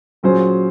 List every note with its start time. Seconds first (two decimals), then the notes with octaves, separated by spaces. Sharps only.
0.23 A#2 F#3 C#4 G#4 C5